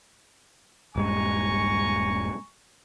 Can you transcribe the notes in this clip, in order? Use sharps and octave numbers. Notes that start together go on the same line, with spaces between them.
D#1 G2 G#3 G#5 A#5 C#6